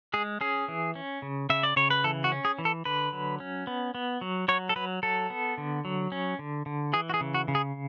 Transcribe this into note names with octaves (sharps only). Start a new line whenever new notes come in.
G#3 G#4
C#4 G#4
E3
C#4
C#3
C#3 E5
D5
C#3 C#5
B4
E3 A4
F#4
C#4
G#4
E3
A4
D3 B4
F#3
C#4
B3
B3
F#3
F#3 C#5
A4
F#3 B4
F#3 A4
B3
D3
F#3
C#4
D3
D3
E3 G#4
F#4
G#4
C#3
F#4
C#3
G#4